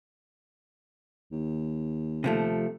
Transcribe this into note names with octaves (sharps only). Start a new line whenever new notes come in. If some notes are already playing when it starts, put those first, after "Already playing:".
D#2
C3 F3 A3